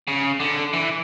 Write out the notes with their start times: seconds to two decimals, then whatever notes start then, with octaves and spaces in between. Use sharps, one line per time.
0.08 C#3
0.40 D3
0.73 E3